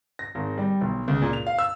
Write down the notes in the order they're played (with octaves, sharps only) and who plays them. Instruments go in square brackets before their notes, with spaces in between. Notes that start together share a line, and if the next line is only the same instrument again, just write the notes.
[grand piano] A#6
G#1
G3
B1
C#2
A#2
F7
F5
E6